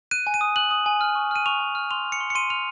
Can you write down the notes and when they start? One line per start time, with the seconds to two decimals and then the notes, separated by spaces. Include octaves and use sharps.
0.11 F#6 D#7
0.27 G#5
0.34 D#7
0.41 D#6
0.56 F#6 F#7
0.71 D#6
0.86 G#5
1.01 F6
1.15 C#6
1.31 F6 D#7
1.46 C#6 F7
1.60 G#5
1.75 F6
1.91 C6 F7
2.05 F6
2.12 C#7
2.21 C6
2.30 C#7
2.35 C6 D#7
2.50 F6 F7